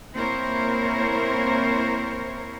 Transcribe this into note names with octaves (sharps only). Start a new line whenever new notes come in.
A#3 C4 E4 A#4 C5 C#5